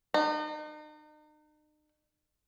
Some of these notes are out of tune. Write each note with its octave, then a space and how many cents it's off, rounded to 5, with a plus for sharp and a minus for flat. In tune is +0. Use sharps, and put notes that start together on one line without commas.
D#4 -40